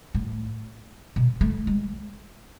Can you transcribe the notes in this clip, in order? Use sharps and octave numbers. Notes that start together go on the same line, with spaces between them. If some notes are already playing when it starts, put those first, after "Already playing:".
A2
B2
A3
G#3